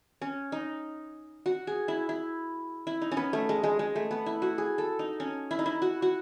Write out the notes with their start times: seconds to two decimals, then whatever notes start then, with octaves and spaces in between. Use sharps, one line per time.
0.21 C#4
0.52 D#4
1.46 F#4
1.67 G#4
1.88 E4
2.09 E4
2.87 E4
3.02 D#4
3.12 C#4
3.17 B3
3.33 A3
3.49 G#3
3.63 G#3
3.79 G#3
3.95 A3
4.11 B3
4.26 E4
4.42 F#4
4.58 G#4
4.78 A4
4.99 D#4
5.20 C#4
5.51 E4
5.59 D#4
5.66 E4
5.82 F#4
6.02 F#4